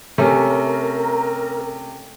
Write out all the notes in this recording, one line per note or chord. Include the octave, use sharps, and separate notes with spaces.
C3 A3 C#4 A#4